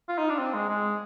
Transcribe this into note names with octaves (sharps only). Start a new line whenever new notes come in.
F4
D#4
D4
C4
G#3
G#3